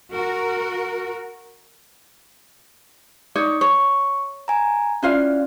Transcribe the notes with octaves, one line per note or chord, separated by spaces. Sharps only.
F#4 A#4
D#4 C#5 D5
C#5 C#6
G#5 A#5
C#4 E4 F4 D5 F5